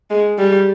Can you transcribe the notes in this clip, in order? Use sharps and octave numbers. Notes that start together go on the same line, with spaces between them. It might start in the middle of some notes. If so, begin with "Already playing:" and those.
G#3
G3